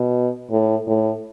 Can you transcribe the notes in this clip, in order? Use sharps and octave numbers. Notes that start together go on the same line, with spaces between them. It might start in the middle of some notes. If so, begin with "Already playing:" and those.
Already playing: B2
A2
A2